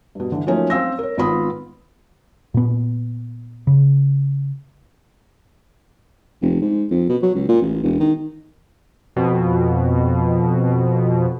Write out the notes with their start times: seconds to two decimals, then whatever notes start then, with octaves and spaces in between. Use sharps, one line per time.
0.15 G2 B2
0.32 D3 E3
0.46 F3 F#3 A3 A#3 C#4 D#4
0.70 C4 F5 E6 A#6
0.99 A#4 C#5
1.17 G#1 B3 F4 B5 D#6
2.54 A#2 B3
3.67 C#3
6.42 F1
6.62 G#2
6.91 F2
7.09 B2
7.23 F#3
7.35 C#2
7.49 A#2
7.62 A1
7.83 E1
8.00 D#3
9.16 F2 B2